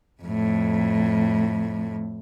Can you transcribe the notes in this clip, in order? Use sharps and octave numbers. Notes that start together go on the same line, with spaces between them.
F2 A2